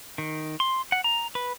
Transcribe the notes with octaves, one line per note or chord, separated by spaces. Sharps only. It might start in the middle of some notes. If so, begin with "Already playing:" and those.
D#3
C6
F#5
A#5
B4